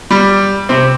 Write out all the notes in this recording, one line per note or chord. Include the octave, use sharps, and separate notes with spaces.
G3
C3 C4